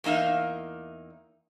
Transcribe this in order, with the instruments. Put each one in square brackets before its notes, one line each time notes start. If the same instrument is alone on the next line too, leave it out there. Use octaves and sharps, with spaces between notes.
[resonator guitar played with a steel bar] E2 A#3 D#4 E5 F5